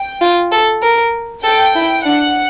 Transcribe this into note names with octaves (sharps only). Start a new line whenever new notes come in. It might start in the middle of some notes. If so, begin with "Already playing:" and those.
Already playing: G5
F4
A4
A#4
A4 G5
E4
D4 F#5